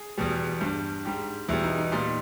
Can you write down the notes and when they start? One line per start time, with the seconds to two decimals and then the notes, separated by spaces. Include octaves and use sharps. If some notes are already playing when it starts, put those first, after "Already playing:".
Already playing: G#4
0.17 E2 B2 G3
0.61 G2 G3
1.05 G#2 G3 G4
1.48 E2 B2 G3 E4
1.63 D#4
1.78 D#4
1.92 A#2 G3 D#4